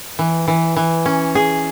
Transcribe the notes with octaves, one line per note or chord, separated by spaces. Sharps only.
E3
E3
E3
C#4
G#4